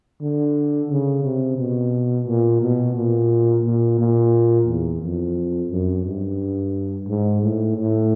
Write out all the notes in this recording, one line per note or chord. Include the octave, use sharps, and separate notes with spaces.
D3
C#3
C3
B2
A#2
B2
A#2
A#2
A#2
E2
F2
F#2
G2
G#2
A2
A2